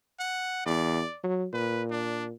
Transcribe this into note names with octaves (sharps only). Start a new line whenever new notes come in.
F#5
E2 D5
F#3
A#2 B4
D4